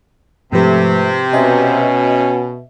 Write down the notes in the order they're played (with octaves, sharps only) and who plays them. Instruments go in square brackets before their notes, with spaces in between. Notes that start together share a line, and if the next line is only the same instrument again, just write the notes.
[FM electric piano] G#2 F3 B4 [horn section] C3 [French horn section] A3
[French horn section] B2 [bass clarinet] C#4 [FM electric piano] D#5 E5